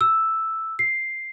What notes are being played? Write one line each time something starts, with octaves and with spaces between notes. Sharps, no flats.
E6
C7